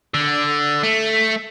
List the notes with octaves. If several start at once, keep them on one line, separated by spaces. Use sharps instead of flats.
D3
A3